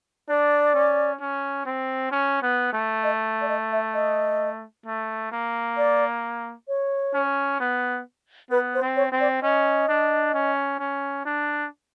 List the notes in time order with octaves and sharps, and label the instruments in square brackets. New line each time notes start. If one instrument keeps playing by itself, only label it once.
[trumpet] D4 [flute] D5
[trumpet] C#4
C#4
C4
C#4
B3
A3
[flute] D#5
D5
D#5
E5
D#5
[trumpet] A3
A#3
[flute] D5
C#5
[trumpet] C#4
B3
[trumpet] B3 [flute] B4
[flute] C5
[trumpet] C4
[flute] C#5
[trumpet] C4
[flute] D5
[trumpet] C#4 [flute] D#5
[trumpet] D4
C#4
C#4
D4